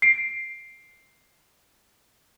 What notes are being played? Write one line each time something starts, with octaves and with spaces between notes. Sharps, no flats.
C7 D7